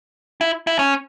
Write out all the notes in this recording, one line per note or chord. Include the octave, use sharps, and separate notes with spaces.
E4
E4
C#4